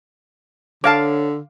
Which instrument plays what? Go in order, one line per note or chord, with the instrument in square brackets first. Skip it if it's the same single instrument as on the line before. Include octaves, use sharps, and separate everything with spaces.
[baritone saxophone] D3 [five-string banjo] C#5 A5 [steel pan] F5 D6